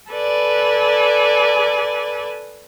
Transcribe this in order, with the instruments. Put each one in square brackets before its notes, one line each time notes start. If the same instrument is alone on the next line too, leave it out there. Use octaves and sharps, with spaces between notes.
[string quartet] A4 B4 D5 G#5